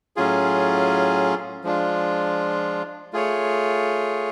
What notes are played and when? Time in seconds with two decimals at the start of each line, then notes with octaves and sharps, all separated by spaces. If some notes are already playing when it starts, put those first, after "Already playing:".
0.16 A2 F#3 C#4 F4 G#4
1.64 F3 G#3 D4 F4
3.13 A3 F4 G#4 C#5